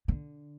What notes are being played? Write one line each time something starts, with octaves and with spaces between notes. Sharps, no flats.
D3